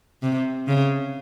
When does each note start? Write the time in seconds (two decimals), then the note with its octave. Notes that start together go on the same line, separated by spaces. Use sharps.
0.23 C3
0.68 C#3